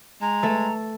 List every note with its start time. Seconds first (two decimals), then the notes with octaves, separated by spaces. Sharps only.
0.21 G#3 A#5
0.43 A3 A4